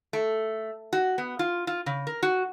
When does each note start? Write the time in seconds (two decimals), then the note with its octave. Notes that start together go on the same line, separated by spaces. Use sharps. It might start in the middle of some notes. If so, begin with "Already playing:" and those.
0.13 A3
0.93 F#4
1.18 B3
1.39 F4
1.67 F4
1.86 C#3
2.07 A#4
2.23 F#4